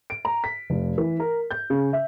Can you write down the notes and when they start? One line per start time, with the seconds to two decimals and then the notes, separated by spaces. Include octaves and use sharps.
0.10 D7
0.25 A#5
0.44 B6
0.70 F1
0.98 E3
1.20 A#4
1.51 G6
1.70 C#3
1.93 E5